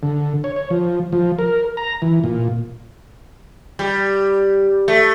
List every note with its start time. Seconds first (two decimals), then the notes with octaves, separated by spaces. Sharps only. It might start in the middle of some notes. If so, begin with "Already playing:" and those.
0.03 D3
0.44 C#5
0.56 C#5
0.70 F3
1.12 F3
1.39 A#4
1.77 A#5
2.02 E3
2.24 A#2
3.79 G3
4.88 A3